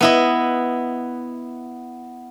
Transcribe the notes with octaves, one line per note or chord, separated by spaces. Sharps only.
B3 E4 D#5